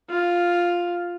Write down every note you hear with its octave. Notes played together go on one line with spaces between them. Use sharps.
F4